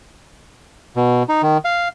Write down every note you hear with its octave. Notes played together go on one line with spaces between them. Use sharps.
B2
D#4
D#3
F5